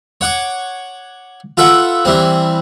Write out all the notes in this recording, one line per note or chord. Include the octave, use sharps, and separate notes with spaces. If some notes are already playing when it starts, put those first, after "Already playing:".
C#5 F#5 C#6 D6
F4 A4 B4 E5 F#5
E3 G3 C4